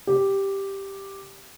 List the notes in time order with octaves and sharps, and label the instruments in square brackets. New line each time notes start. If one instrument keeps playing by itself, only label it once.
[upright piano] G4